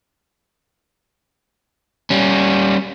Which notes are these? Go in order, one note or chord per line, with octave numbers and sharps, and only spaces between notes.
G3 C#4